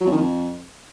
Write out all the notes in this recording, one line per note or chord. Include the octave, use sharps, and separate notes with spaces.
F#3
F2
D#3
F2